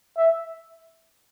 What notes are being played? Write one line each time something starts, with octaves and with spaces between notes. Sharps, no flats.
E5